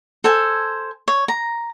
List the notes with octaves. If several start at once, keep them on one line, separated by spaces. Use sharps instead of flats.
A4 C5 G#5
C#5
A#5